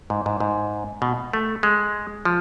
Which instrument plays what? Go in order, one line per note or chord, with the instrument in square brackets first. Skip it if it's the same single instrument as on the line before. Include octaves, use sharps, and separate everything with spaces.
[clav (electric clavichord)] G#2
G#2
G#2
B2
A3
G#3
F3